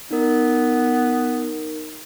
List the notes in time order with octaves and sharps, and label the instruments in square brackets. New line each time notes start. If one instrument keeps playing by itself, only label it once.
[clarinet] B3 [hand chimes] D#4 A#4